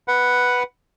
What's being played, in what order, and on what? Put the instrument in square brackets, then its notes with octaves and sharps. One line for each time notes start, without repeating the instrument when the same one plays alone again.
[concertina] B4 F#5